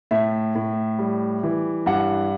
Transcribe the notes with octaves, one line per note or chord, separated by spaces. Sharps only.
A2 E5
A2
G3
E3
G2 F#5